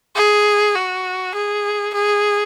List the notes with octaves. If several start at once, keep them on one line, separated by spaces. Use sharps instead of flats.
G#4
F#4
G#4
G#4